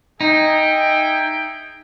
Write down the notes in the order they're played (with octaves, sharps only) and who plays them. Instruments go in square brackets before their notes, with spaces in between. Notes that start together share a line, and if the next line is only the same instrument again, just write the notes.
[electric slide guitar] D#4 [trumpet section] G#4 E5 G5